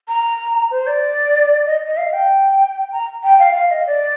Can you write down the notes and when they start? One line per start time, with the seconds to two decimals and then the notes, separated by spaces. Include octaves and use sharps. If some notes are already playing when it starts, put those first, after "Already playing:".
0.08 A#5
0.71 C5
0.87 D5
1.66 D#5
1.87 D#5
1.97 F5
2.13 G5
2.92 A#5
3.23 G5
3.39 F5
3.55 F5
3.71 D#5
3.87 D5